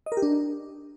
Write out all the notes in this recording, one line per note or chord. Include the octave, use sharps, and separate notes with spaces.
D#5
A#4
G4
D4